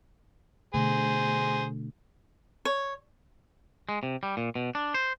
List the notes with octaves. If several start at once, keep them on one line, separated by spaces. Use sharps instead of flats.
B2 D3 A3 G#4 C5
C#5
G#3
C3
G3
A#2
B2
D4
C5